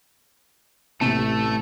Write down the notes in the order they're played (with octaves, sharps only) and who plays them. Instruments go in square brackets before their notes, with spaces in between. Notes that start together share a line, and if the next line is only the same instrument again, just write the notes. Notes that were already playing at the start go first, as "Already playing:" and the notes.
[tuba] A1 [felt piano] C3 [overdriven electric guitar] A3 [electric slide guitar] A5